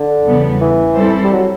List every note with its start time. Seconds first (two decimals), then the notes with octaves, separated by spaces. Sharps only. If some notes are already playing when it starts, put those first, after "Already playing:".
Already playing: D3
0.26 E2 C#3 E3 G3 B3
0.61 E3
0.97 G3 C4 E4 A4 C5
1.24 G3
1.33 F#3